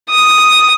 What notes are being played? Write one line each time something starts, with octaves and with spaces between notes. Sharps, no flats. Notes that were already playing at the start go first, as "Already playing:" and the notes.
D#6